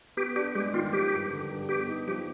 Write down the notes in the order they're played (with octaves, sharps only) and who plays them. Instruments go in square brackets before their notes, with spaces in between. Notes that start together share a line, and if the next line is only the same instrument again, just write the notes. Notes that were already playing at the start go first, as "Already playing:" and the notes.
[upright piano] B3 [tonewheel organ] G4
[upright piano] D4 [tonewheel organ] G4
[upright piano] G#3 [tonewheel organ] G4
[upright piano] D#3 [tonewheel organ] F4
[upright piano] F3 [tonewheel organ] G4
[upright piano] G2
D3
G2
[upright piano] B3 [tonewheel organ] G4
[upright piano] D#4
[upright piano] F3 [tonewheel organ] G4